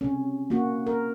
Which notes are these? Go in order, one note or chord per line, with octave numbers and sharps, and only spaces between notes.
C3 C#4
A#3 C#4 F#4
A#4